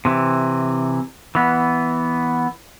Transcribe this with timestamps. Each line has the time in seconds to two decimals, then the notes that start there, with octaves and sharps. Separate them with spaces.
0.05 C3 E3
1.35 E3 B3